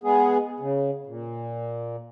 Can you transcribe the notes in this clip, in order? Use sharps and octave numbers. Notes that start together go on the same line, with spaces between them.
G#3 B3 G#4
C#3
A#2